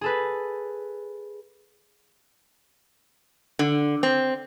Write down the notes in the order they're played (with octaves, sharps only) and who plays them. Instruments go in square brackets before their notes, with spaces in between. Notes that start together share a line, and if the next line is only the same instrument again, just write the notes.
[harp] G#4 A4 B4
[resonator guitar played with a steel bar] D3
C4